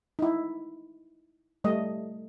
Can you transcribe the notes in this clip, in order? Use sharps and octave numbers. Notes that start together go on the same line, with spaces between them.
D#4 E4
G3 A3 D#5